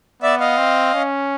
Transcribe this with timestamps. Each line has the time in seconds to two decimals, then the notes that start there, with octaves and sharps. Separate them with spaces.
0.22 B3 D5 E5
0.40 D#5 F5
0.57 C4
0.94 C#4